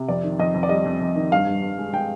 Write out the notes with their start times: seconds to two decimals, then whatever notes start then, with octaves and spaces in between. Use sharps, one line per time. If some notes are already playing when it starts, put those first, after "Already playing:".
Already playing: C3
0.08 F2 D5
0.23 D#3
0.39 F2 D#5
0.54 F2
0.63 D5
0.69 G3 D#5
0.85 F2
1.01 F2
1.16 D#3
1.32 G2 F5
1.47 G2
1.62 G2
1.78 G#3
1.93 G#3 G5